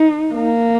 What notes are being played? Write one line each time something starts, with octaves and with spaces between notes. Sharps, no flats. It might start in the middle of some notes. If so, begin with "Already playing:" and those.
Already playing: D#4
A#3